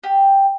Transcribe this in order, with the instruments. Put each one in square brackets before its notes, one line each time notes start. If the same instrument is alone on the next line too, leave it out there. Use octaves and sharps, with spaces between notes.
[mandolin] G4